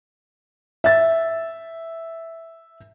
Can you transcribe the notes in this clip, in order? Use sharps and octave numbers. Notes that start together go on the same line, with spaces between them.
E5 A6